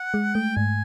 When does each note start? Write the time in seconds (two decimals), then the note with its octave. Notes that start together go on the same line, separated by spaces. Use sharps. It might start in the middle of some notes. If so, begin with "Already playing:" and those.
Already playing: F#5
0.14 G#3
0.35 A3 G5
0.56 G#2 G#5